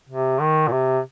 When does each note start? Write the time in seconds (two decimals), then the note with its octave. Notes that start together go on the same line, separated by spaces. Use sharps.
0.09 C3
0.39 D#3
0.67 A#2
0.71 C3